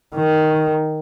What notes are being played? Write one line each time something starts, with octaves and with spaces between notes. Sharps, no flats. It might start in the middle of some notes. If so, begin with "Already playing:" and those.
D#3